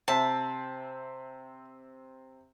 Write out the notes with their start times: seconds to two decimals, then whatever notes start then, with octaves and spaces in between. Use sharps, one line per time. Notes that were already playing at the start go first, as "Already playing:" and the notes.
0.08 C3 C4 E5 A5